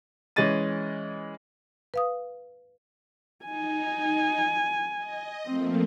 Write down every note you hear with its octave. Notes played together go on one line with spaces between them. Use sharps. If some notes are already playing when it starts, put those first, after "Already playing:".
E3 G#3 C#4 D#5 A6 D#7
B4 F5 D#6
D#4 G#5
D#5
F3 A3 A#3 C4